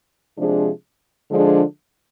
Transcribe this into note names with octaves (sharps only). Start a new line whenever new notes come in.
C3 F3 G#3 D4 G#4
D3 F3 G#3 D4 G#4